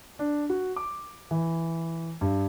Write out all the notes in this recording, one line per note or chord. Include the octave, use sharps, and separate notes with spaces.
D4
F#4
D6
E3
G2